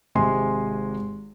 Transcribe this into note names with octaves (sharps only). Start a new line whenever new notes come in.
G#1 C3 G#3 G#5 C6